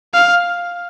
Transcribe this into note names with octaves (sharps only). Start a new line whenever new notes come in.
F5